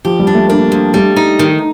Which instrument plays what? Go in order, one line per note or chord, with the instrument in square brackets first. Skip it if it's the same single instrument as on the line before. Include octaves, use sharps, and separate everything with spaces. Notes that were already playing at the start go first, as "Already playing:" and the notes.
[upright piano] F3 [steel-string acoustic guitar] G4
[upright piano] G3
[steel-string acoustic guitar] D4
[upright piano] A3
[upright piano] A#3 [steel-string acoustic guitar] D4
[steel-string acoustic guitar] F2
[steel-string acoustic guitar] G3 [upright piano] A3
[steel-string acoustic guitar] D#4
D#3